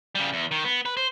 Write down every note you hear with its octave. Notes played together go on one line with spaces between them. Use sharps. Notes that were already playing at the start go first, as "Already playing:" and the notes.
C#3 G3
E2
D#3
B3
B4
C5